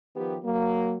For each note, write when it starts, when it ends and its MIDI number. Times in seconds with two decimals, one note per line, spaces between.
0.15 0.36 51
0.15 0.36 53
0.15 0.36 59
0.15 0.36 67
0.44 0.97 54
0.44 0.97 58